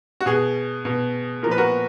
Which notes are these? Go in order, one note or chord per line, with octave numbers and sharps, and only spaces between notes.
F#4
B2 G#4
B2
A#2 F3 A#4
B4
F#4 A#4